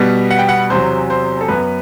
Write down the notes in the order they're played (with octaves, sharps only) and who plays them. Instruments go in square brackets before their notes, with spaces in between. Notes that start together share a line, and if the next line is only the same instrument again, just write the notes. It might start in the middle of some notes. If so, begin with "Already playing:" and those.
Already playing: [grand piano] B2 G3 B3
F#5
G5
F#5
E2 C3 F#3 C5
C5
A4
F#2 F#3 B3 B4